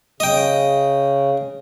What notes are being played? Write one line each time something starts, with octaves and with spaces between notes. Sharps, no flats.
C#3 D#5 G5